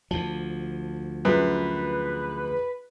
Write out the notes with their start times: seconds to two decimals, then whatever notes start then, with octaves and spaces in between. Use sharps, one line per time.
0.11 D2 F3 A5
1.25 F#2 F4 G#4 A#4 B4